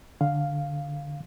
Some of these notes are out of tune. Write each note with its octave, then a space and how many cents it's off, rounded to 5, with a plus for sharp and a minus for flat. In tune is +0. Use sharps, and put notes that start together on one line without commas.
D3 -5 F5 +0